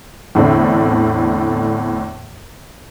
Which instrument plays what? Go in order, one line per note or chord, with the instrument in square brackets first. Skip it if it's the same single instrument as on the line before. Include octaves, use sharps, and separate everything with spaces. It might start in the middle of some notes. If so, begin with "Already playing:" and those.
[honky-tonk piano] E2 A2 D3 C4